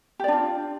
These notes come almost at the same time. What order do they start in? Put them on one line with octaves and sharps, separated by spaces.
G4 D5 D4 F4